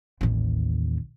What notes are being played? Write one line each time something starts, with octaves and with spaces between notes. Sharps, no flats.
A1 D#2